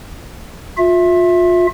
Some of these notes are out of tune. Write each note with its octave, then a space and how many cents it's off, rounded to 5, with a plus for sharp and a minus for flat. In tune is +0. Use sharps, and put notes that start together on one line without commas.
F4 +30 E5 +0